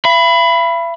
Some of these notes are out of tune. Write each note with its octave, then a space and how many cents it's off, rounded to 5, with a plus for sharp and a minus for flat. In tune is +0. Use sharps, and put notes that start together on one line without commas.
E5 +45 B5 +0